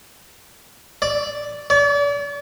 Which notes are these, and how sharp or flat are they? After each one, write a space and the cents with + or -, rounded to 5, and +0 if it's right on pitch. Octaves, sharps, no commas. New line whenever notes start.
D5 -5
D5 -40